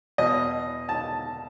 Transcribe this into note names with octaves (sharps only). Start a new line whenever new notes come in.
E2 B2 D#5
A5